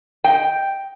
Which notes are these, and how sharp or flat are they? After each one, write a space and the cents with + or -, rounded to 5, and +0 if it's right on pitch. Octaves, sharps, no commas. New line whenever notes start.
D#5 +15 G5 +0